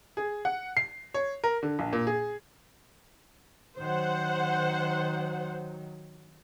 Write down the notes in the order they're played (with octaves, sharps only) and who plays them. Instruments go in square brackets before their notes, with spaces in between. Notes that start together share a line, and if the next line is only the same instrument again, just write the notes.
[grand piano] G#4
F#5
C7
C#5
A#4
D3
A#1
A#2
G#4
[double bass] D#3 F#3 [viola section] C5 F#5